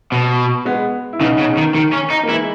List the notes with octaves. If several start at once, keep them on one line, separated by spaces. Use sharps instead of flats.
B2
G#3 B3
E4
C#3 B3 D#4
C#3
D#3
D#3
C#4
D#4
A#3
E3 G#3 E4